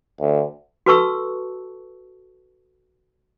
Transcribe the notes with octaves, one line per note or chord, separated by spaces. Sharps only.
D2
F#4 A4 B4 A5 C#6 E6